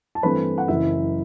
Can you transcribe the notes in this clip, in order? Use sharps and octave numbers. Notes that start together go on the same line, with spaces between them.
A5
G2 E3 A3 C4 B4 B5
F#5
F#1 F#2 E3 E4 E5